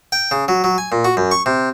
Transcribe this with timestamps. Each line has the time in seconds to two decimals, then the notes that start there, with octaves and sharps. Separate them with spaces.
0.12 G5
0.31 C#3
0.48 F#3
0.64 F#3
0.78 G#5
0.92 A#2
1.05 F#4
1.17 F#2
1.31 C#6
1.46 C3